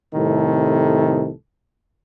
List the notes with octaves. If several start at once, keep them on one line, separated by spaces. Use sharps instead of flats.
C2 A2 C3 D#3 A4